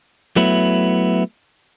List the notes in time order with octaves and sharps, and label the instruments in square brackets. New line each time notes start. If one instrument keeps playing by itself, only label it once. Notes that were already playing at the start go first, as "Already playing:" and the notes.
[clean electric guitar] F#3 A3 B3 E4